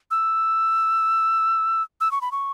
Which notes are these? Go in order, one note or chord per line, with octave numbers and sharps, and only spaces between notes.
E6
E6
C#6
B5
C#6